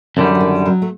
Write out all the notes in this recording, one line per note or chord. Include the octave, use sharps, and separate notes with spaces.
F#2 D3 D#3 G3
F#3
D#3
F#3
A3